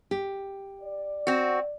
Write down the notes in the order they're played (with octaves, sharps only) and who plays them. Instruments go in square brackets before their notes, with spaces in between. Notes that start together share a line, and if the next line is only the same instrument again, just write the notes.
[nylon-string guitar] G4
[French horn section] D5
[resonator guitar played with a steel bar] C4 F#4